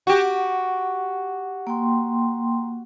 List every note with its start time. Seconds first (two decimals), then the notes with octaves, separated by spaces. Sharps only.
0.07 F#4 G4
1.67 A#3 G5 C6